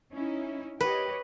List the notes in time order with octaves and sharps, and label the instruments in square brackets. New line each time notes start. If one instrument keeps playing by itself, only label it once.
[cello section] C#4 D#4 E4
[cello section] G4 C#5 D#5 [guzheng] B4